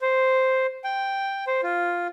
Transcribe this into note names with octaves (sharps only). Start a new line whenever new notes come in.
C5
G5
C5
F4